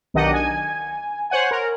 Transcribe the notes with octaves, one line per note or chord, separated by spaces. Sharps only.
B1 D#3 D4 G4 D#5 F#5
G#5
C5 C#5 F#5 G#5
A#4